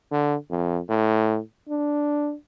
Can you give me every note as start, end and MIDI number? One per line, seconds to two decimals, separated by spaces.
0.11 0.35 50
0.50 0.80 41
0.89 1.39 45
1.69 2.34 62